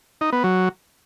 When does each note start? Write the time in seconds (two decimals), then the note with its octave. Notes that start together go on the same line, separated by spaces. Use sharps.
0.21 D#4
0.32 B3
0.44 F#3